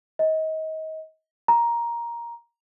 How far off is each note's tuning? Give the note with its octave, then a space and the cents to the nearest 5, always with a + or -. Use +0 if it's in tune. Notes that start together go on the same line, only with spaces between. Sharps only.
D#5 +30
A#5 +10